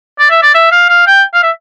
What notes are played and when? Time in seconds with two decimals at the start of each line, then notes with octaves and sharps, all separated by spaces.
0.19 D5
0.30 E5
0.42 D5
0.54 E5
0.72 F5
0.89 F5
1.07 G5
1.34 F5
1.43 E5